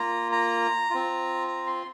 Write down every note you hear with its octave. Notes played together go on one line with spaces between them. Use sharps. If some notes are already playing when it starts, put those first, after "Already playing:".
Already playing: A#3 F4 A#5
A#5
C4 F4
A#5
C6